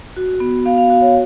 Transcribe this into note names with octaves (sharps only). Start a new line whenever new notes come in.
F#4
B3
B3 F5
F5
F#4 F5
C#5